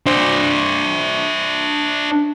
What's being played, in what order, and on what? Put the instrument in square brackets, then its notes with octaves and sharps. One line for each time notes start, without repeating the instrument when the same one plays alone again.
[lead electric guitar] D4 C5